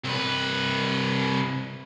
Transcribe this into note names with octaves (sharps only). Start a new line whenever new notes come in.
C2 B4